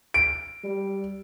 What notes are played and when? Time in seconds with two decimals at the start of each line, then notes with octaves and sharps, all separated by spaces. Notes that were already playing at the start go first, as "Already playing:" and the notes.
0.14 D7
0.64 G3